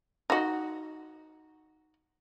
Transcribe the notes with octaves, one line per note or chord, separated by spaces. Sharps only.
D#4 F#4